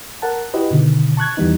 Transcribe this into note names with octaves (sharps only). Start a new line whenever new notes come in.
A#4 F#5 A5
E4 F#4 G4 B4 D#5
B2 D3 D#3
A5 C#6 F#6 G#6
E2 D#3 E3 G3 B3 D#4